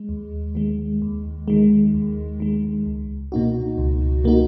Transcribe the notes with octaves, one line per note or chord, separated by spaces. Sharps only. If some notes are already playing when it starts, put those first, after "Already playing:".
Already playing: G#3
D#2
D#3 G#3
D#2
D#3 G#3
D#2
D#3 G#3
C#2
B2 A#3 D#4 F#4
C#2
B2 A#3 D#4 F#4